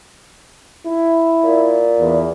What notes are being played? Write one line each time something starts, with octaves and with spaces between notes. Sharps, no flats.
E4
A#2
E2